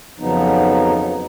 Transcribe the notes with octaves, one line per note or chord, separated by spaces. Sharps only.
F2 C#3 F3 F#3 B3 D#4